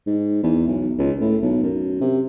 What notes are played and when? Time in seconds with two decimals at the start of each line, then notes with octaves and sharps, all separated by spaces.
0.06 G#2
0.43 E2
0.67 B1
0.99 C#2
1.21 A2
1.43 B1
1.63 F#2
2.01 C3